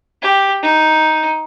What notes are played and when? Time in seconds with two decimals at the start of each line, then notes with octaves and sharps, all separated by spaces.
0.22 G4
0.63 D#4